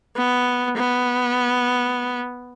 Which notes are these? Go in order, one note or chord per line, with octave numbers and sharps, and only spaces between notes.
B3
B3